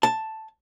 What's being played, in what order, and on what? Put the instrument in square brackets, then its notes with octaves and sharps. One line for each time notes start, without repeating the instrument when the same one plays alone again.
[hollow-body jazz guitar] A5